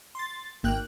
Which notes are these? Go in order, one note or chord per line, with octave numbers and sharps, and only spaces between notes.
C6 A6
G#1 A#3 G5 F#6